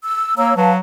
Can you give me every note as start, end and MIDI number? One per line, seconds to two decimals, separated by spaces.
0.03 0.34 88
0.37 0.56 58
0.37 0.53 73
0.37 0.53 82
0.37 0.53 88
0.57 0.80 54
0.57 0.73 71
0.57 0.73 77
0.57 0.73 81